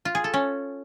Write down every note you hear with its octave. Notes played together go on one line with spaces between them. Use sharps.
F4
G#4
A4
C#4